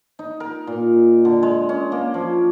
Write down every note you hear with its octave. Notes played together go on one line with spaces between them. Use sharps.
D#4
A#4
A#2
D3
G#3
C#4
A#3
F3